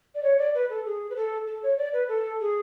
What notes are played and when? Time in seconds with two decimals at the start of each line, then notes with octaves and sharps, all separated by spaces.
0.15 D5
0.23 C#5
0.38 D5
0.54 B4
0.69 A4
0.85 G#4
1.10 B4
1.16 A4
1.47 A4
1.63 C#5
1.77 D5
1.93 B4
2.08 A4
2.40 G#4